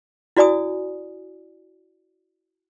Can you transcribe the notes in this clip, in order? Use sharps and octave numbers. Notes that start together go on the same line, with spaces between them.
E4 F#4 D5 G#5 D#6